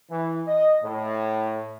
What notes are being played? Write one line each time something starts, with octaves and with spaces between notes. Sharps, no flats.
E3
D#5
A2